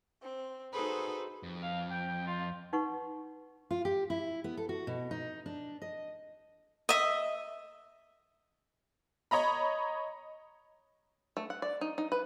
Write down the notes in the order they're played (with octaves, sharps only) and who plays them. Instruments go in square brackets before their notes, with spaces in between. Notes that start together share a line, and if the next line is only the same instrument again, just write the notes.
[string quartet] C4
D#4 F#4 G#4 A4 B4 C5
[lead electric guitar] F2
[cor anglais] F5
G5
F4
[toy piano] D#4 B4 F#5 C#6
[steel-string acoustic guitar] F4
G4
E4
B3
A4
F#4
B2
D#4
D4
D#5
[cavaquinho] D#5 E5
[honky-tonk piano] C#5 D#5 A#5 B5
[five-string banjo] A3
F#5
D5
D#4
D#4
B4